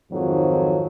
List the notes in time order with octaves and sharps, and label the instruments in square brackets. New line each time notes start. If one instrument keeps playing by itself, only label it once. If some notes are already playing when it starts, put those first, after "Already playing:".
[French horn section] F2 G#2 D#3 F3 F#3